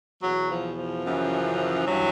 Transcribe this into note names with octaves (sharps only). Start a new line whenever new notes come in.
E2 B2 F#3
F3
F3
F#2 C#3 E3
G2 E3 F#3